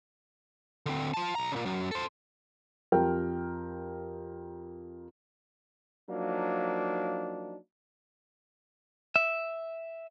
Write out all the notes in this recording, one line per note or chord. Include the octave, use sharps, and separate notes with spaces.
D3 C4
F4 A5
B1 A#5
A#2 C#3
F#2
A4 C5
F2 G4 A#4 G5 F6
F3 F#3 A#3 D4 D#4
E5